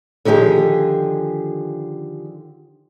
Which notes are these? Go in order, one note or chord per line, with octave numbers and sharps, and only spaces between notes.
D3 D#3 F3 G4 G#4